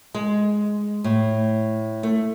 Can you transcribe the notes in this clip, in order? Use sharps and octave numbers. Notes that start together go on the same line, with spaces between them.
G#3
A2
A3